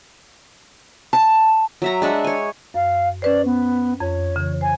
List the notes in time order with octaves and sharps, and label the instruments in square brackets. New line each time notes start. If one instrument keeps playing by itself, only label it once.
[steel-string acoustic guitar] A5
[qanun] F#3 E5 A#5
G#3 D4 E5 F#5
C#5 G#5
[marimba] F#2 [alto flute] F5
[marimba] C#4 B4 C5 [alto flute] D5
[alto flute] B3
[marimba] F2 [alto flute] C#5
[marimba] C#3 E3
[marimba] C5 [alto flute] G#5